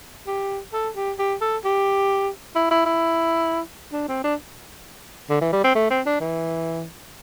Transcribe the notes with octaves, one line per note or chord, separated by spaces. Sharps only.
G4
A4
G4
G4
A4
G4
E4
E4
E4
D4
C4
D4
D3
E3
G3
C4
A3
C4
D4
E3